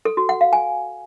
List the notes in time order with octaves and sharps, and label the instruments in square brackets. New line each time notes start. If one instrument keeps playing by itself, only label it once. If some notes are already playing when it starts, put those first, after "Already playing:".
[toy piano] A4
F#4
F#5
F5
G#5